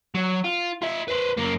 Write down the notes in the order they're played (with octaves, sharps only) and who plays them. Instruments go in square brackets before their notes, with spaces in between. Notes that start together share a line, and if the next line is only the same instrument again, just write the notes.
[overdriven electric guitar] F#3
F4
F4 E5
B4 C5
F#2 A#3